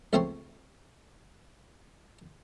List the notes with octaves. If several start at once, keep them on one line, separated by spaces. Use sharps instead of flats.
C#2 A3 C4 C#5 G5 C6